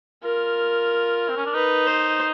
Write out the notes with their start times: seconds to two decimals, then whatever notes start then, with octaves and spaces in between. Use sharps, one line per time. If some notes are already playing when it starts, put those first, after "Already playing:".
0.23 F4 A#4
1.29 C4
1.37 C#4
1.46 D4
1.54 D#4 B4
1.87 C5